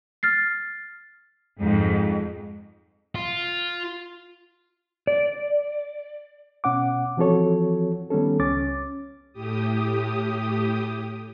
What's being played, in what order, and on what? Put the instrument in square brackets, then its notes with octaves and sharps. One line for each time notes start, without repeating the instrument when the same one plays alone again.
[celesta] F6 A6 C7
[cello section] F2 G#2
[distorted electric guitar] F4
[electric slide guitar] D5
[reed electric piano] B2 C#4 F#5 D6
E3 F3 C4 F#4 A4 C#5
D#3 G3 B3 C#4 A4
C#2 C#4 D6 A6
[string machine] A2 G4 D#6